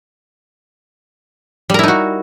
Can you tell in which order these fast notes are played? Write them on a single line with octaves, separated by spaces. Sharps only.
G3 A#4 E4 D#4 F#4